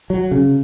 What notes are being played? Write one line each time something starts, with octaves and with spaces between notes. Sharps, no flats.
F#3
C#3